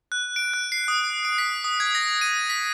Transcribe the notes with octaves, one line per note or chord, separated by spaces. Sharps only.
F#6
D7
F#6
C7
D#6
D7
B6
D#6
G#6
A#6
D#7
B6